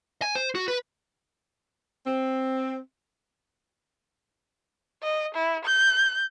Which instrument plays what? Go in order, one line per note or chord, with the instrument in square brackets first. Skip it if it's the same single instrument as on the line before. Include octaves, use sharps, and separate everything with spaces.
[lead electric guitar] G#5
C5
F#4
B4
[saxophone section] C4
[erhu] D#5
E4
G6